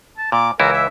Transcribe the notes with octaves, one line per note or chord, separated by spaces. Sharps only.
A5
A#2 D6
C#2 E3 E4 A#4
E5